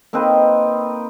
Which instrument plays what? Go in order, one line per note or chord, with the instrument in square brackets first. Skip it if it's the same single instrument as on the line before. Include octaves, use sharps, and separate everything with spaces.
[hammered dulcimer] A#3 C4 D#4 B4